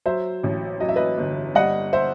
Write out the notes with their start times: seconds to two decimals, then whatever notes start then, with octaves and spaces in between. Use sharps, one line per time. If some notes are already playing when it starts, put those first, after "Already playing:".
0.06 F#3 C5 E5
0.43 A1
0.80 F#3 D#5
0.89 E5
0.96 B4 D#5
1.18 G1
1.55 G3 D#5 F#5
1.93 C5 E5